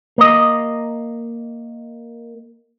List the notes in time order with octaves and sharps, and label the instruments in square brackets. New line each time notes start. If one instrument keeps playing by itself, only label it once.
[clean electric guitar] A#3 D#5